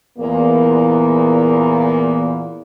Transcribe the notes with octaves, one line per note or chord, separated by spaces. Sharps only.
E2 A#2 A#3